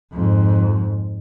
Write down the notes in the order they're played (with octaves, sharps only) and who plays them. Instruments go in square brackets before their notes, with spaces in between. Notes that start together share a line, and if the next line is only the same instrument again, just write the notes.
[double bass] F2 G#2